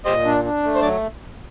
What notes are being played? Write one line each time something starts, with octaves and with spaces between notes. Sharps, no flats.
A#2 G4 C5 D#5
D4
D4
A3
C5
F#3 D5